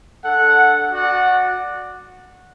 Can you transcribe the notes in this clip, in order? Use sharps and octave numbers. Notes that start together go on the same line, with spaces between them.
D4 A4 F#5
F#4 D5 F#5